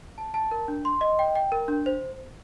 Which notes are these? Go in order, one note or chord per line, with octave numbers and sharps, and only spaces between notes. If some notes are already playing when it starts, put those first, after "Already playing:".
A5
A5
A#4
D4
C6
D#5
G5
G5
A#4
D4
C5